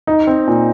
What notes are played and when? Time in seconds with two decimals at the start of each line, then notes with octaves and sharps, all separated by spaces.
0.07 D#4
0.27 C4
0.47 A#2